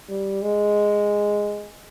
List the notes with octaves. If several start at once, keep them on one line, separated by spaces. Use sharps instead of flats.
G3
G#3